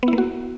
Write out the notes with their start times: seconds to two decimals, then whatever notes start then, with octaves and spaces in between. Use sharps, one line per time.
0.03 B3
0.08 E4
0.13 A#3
0.18 F#4